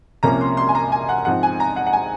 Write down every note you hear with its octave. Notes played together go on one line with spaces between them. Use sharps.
C2 C3 F3 A#3 C#4 A#5
C6
C6
G#5
A#5
G#5
F#5
G#2 F3 C4 F#5
G#5
A#5
F#5
F#5
G#5